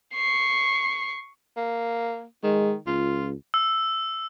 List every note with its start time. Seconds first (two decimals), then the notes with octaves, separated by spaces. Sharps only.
0.14 C#6 C7
1.57 A#3
2.44 D#3 G#3
2.87 C#2 F4
3.54 E6